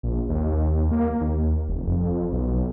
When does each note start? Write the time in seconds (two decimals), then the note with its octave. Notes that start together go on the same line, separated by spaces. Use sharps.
0.03 A#1
0.29 D#2
0.91 A#3
1.21 D#2
1.68 F1
1.87 F2
2.32 B1